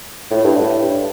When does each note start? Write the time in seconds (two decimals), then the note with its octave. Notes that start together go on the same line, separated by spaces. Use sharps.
0.31 A2
0.44 G2
0.58 A2
0.81 G2